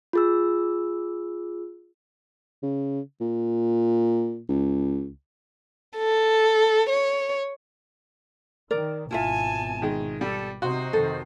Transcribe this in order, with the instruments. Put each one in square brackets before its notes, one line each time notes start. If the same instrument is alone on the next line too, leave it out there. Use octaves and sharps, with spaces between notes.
[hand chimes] F4 G#4 E6
[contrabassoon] C#3
A#2
C#2
[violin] A4
C#5
[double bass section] D#3 [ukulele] A#4 D5
[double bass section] G#1 B2 [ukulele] E4 F4 E5 [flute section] G#5 A5
[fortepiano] D#3 G#3
[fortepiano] G3 [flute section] A4
[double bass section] C3 [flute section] D#4 C5 [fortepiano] F#4 C6
[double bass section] F2 C3 D#3 [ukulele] A4